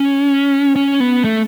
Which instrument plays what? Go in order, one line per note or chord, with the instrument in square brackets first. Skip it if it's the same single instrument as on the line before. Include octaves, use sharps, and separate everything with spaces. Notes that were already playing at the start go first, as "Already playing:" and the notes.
Already playing: [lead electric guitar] C#4
C#4
B3
A3